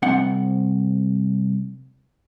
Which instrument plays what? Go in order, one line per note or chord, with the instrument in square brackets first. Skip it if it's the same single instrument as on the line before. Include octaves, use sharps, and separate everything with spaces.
[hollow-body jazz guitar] C2 C4 F#5